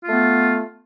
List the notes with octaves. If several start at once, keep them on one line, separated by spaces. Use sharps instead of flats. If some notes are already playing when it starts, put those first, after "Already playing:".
A3 B3 F4